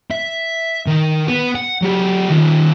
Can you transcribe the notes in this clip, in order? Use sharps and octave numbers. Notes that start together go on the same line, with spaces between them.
E5
D#3
B3
F#5
F#3 G4
D#3 F4